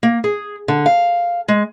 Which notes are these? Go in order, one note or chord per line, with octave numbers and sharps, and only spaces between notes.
A#3
G#4
D3
F5
G#3